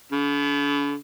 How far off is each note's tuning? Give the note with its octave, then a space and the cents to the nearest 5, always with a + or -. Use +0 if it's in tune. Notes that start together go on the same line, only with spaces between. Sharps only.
D3 -45